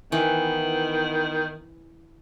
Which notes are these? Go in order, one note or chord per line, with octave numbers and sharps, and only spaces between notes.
D#3 E3 B3 E4